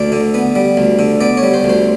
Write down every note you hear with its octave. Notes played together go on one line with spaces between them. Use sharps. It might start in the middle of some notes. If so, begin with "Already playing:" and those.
Already playing: D2 D5
D3
B3
G3
D2
D3
B3 D5
C#5
G3
C5
D2
C5